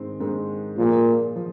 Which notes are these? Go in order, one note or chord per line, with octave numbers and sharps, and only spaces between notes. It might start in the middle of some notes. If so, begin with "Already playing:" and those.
Already playing: G#2 D#3 G#3 C4
G#2 D#3 G#3 C4
A#2 F3 A#3 G#4
F3